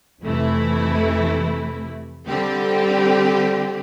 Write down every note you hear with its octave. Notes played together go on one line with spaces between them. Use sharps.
F2 C3 E3 A3 E4
D3 G3 C4 G4